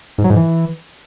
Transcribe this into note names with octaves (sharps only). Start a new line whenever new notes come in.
G#2
F#3
G#2
E3